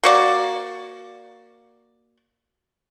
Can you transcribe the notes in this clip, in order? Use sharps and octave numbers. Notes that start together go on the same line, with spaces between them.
A#3 F#4 D5